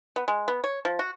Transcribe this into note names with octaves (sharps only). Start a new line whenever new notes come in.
B3
G#3
B3
C#5
F3
F#4